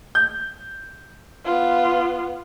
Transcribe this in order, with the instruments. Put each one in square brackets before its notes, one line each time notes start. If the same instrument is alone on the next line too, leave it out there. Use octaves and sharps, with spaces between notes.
[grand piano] G6
[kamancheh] B3 F4